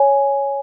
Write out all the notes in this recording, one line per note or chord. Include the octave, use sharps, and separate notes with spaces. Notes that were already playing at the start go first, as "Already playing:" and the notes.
Already playing: C#5 G#5